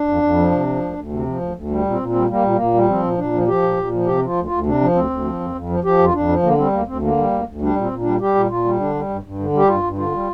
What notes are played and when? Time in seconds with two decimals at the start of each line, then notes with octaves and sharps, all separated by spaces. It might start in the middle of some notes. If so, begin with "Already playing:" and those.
Already playing: D4
0.08 F2
0.22 F2
0.37 F3
0.52 C3
0.67 F3
0.81 D2
0.97 D2
1.11 C3
1.26 F3
1.41 D2
1.55 D2
1.70 G3
1.85 A#2 C4
2.00 A#2
2.09 C4
2.15 G3
2.29 G3 A#3
2.43 A#2
2.56 A#2 A#3
2.74 G3
2.89 F3 C4
3.03 A#2
3.18 A#2 D4
3.33 F3
3.47 F3 G4
3.62 A#2
3.77 A#2
3.92 F3
4.06 C3 G4
4.22 F3 F4
4.36 D2
4.46 F4
4.51 D2
4.66 C3 D4
4.81 F3
4.95 D2 C4
5.10 D2
5.25 F3
5.40 F2
5.55 F2
5.69 F3
5.84 F3 G4
5.98 F2
6.04 F4
6.13 F2 D4
6.28 F3
6.43 D3 A#3
6.58 G3 C4
6.72 D2 A#3
6.87 D2 C4
7.02 D3 A#3
7.17 G3
7.31 D2
7.47 D2
7.61 G3 D4
7.76 A#2
7.81 C4
7.91 A#2
8.01 G3 D4
8.21 G3 G4
8.35 A#2
8.50 A#2 F4
8.65 G3
8.79 D3 D4
8.94 G3
9.09 G2
9.23 G2
9.39 D3
9.53 G3 G4
9.68 G2 F4
9.83 G2
9.98 D3 F4
10.12 G3